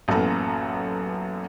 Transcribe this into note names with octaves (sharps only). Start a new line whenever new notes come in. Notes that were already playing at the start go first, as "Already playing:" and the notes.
A1 F#2 A#3 B3 A4 A#5